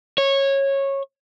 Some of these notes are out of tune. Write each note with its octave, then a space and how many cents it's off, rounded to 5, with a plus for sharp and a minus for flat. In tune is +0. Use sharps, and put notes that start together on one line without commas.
C#5 -15